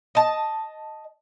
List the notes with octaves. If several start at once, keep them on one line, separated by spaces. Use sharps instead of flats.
D#5 A5